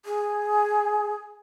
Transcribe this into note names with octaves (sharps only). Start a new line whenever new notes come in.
G#4